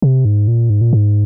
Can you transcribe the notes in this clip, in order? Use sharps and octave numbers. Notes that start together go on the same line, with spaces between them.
C3
G#2
A#2
G#2
A#2
G#2